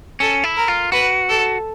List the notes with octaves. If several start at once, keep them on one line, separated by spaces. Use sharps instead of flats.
C#4 A4
E4
A#4
F4
F#4 B4
A4